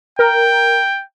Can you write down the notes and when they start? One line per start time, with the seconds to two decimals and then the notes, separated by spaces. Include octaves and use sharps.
0.19 A#4 G5